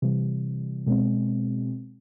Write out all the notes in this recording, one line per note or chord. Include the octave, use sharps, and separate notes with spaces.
C3 E3 G3
B2 G#3 C4